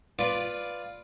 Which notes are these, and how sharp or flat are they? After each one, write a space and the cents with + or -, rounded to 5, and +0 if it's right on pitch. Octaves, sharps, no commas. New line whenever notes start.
F4 +0 B4 +0 D5 +0